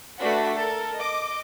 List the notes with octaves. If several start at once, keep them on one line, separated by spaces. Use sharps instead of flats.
A3 D4 F#4 B4 F#5 B6
A4 A#4
D#5 D6